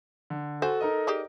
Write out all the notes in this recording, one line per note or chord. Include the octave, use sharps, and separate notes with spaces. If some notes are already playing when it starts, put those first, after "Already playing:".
D3
F#4 A4 C5 G#5
D#4 A#4 D#5
G4 G#4 D5